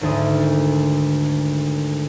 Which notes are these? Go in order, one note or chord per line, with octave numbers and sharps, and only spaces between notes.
G#1 D2 D#6